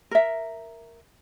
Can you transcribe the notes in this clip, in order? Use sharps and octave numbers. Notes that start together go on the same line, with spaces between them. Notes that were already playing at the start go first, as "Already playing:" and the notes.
A#4 E5